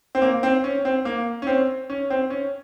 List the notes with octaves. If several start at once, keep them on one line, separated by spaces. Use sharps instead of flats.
C4
A#3
C4
C#4
C4
A#3
C#4
C4
C#4
C4
C#4